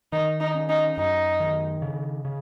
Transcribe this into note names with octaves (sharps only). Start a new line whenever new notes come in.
D#3 D#4
D#4
C#4
D#4
F#2 D#4
D#3
C#3
C#3